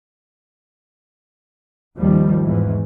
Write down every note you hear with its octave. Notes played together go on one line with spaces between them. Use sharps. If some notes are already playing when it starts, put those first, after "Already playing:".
G#1 D#2 D#3 F3 G3
E2 G#2 E3